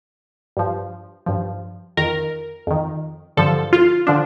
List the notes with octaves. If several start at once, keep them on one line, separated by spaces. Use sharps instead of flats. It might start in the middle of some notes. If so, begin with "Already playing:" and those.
G2 F3
G2 F3
F2 D#3 A#4
F2 D#3
G2 D3 F3 A4
F4
D3 F3 D4